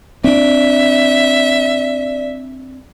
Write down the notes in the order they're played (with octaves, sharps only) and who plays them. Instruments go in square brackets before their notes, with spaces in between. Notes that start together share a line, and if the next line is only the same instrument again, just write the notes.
[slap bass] C4 D4 [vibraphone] D5 [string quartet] E5